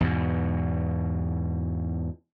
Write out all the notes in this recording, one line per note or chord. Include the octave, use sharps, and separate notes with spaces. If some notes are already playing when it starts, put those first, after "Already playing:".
E2 G#2 B2